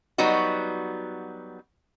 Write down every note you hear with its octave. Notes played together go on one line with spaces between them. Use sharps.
F#3 G3 B3 D#4 F#4